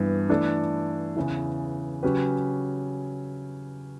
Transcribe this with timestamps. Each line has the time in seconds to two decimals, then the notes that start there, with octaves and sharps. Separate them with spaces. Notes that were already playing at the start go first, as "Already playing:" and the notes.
Already playing: G2 E3 B3
0.29 E3 A3 D4 A4
1.17 E2 C#3 E3
2.03 C#3 F#3 C#4 G4 B4